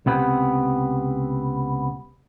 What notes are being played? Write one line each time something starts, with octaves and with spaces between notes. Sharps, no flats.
C#2 C3 B3 C4